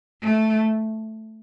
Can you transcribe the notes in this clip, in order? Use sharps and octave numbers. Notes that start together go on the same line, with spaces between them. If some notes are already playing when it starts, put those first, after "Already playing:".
A3